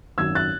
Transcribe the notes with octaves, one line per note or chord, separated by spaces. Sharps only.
G#1 F#2 D#3 E6 G#6
F#6 A6